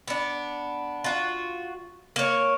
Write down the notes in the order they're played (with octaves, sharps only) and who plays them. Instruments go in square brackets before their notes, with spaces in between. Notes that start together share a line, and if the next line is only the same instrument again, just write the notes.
[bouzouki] B3 D4
F4 F#4
A#3 C#5